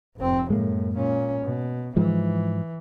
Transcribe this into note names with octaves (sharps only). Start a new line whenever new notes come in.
F1 C4
F#2 A2 G#3 A#3
A#2 C#4
B2
G#2 E3 F3 G#3